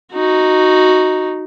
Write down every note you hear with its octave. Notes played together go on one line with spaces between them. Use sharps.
D#4 F#4